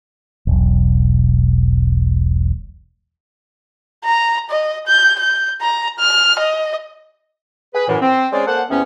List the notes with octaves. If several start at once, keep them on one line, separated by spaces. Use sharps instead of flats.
E1 B1
A#5
D#5
G6
G6
A#5
F6
D#5
G#4 B4
F#2 A2 E3
C4
G#3 C#4 G#4 C5 D5
A#3 A4 C5 F#5
E2 C3 B3 C#4